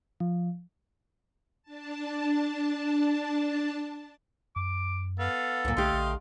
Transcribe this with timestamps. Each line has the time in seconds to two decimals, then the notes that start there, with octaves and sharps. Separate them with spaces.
0.20 F3
1.63 D4 A5
4.56 F#2 D6
5.19 B3 A4 F5
5.65 C#2 F#2 A#2
5.77 B1 D3 A3 G4 D#5 F5 C6
5.93 A#1